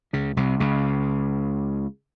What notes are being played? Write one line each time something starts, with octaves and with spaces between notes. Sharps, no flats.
C#2 C#3
C2 C3
C#2 C#3